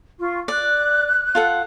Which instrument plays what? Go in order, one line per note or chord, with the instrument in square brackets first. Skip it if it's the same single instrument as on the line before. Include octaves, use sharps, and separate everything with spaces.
[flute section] F4 C#6
[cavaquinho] D5 [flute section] F#6
[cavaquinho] F4 A4 F#5